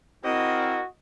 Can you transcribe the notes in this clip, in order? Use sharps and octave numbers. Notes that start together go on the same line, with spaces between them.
C4 E4 F#4 A#4 D#5